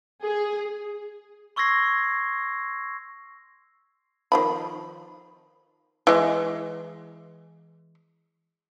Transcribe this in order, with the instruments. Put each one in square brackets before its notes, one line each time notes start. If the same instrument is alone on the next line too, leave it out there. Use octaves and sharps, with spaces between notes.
[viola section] G#4
[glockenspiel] C6 C#6 E6 G#6 A#6 C7
[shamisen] D#3 F3 B5
E3 G#3